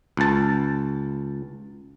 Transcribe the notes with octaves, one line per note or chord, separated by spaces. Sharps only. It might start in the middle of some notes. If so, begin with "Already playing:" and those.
C#2 A5